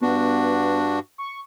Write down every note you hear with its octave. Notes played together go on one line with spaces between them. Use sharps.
G2 B3 D4 F#4
C#6